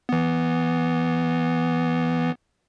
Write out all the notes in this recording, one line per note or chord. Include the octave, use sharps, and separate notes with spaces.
E3 B3